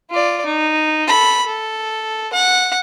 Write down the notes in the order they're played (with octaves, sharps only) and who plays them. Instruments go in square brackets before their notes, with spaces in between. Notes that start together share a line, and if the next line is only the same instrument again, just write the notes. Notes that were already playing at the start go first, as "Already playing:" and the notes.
[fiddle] F4 D5
D#4
A4 B5
A4
F#5